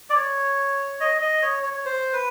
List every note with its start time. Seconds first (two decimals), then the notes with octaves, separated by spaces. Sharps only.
0.10 D5
0.15 C#5
1.00 D#5
1.21 D#5
1.42 C#5
1.63 C#5
1.74 C#5
1.85 C5
2.13 B4